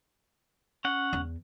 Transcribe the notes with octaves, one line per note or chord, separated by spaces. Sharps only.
C#4 F#5
E2